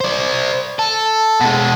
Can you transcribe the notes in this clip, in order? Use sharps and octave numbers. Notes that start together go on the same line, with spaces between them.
C5 D5
A4
B2 G#3